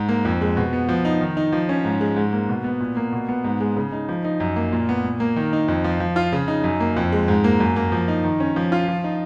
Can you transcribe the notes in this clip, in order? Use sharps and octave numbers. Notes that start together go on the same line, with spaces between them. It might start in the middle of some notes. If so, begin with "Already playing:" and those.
Already playing: G#2
A#3
F2
G#3
B2
B3
F3
D#4
D#3
D#4
F3
C#4
G#2
G#3
G#2
A#3
B2
B3
A#2
A#3
B2
B3
G#2
G#3
C#3
D#4
F3
D#4
F#2
A#3
A#2
B3
A#2
A#3
D#3
D#4
F2
F3
F3
F4
C#3
D#4
F#2
A#3
F2
G#3
G#2
A#3
F#2
A#3
F3
D#4
D#3
C#4
F3
F4
F3
D#4